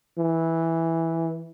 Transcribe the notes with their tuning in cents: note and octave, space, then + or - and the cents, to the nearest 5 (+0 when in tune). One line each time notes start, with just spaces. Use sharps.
E3 -5